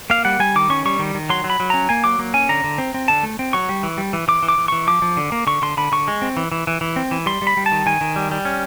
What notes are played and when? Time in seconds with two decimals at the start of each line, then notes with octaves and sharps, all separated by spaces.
0.10 A#3 F5
0.25 G3 F#5
0.40 G3 G#5
0.56 D#3 D6
0.70 C#4 C#6
0.85 G3 C#6
0.99 D#3
1.14 D#3
1.30 F#3 C6
1.44 F#3
1.50 B5
1.60 F#3
1.70 C#4 A#5
1.89 A#3 G#5
2.04 F#3 D6
2.19 A#3
2.34 C#4 G#5
2.49 D3 A#5
2.64 D3
2.78 C4
2.94 C4
3.08 D3 A5
3.23 A3
3.39 C4
3.53 F#3 C#6
3.69 G3
3.83 E3
3.98 G3
4.13 E3
4.28 E3 D6
4.43 E3
4.48 D6
4.58 E3
4.68 E3 C#6
4.87 F3 D6
5.02 F3
5.17 D3
5.32 A#3
5.47 D3 C#6
5.62 D3 C6
5.77 D3 B5
5.92 D3 C#6
6.08 G#3
6.22 C4
6.37 E3
6.52 E3
6.67 E3
6.81 E3
6.96 C4
7.11 E3
7.26 G3 C6
7.42 G3
7.47 B5
7.57 G3
7.66 A5
7.72 D#3
7.86 D#3 G#5
8.01 D#3
8.16 G3
8.31 G3
8.45 C#4